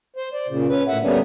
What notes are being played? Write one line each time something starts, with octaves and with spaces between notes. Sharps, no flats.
C5
D5
A#2 C#3
C#4 B4
A2 E5 F#5
D3 G3 A#3 B3 C#4 D4